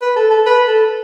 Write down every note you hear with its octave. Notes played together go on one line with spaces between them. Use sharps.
B4
A4
A4
B4
A4